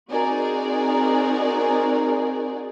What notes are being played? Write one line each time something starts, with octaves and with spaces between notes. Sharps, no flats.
C4 D#4 F#4 G#4 A#4 D5